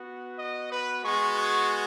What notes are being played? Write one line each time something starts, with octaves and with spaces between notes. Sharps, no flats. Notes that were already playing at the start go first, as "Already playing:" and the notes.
Already playing: B3 F#4
D#5
B4
G#3 B3 F#4 C#6
C#6